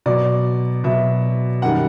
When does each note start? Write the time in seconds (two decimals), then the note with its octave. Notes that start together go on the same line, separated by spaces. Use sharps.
0.06 B2 F#3 D5
0.84 B2 F#3 E5
1.62 F#2 D#3 G3 F#5